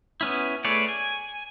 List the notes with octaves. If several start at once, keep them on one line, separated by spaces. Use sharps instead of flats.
B3 C#4 E4
A3 G#4 B4 C#5 D5
G#5